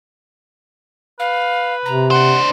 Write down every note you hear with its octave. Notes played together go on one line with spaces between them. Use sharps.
B4 F5
C3 A#5
D4 C5 F#5